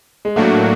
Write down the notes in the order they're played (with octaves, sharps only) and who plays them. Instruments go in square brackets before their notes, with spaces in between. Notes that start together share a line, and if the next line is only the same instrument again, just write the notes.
[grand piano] G#3
[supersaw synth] A2 F#3 A#3 D4 F#4 [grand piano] A3